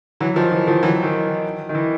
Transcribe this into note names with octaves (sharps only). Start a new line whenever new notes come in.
E3 F#3
D#3 F3
E3
D#3 F3
E3 F#3
D#3
D#3
E3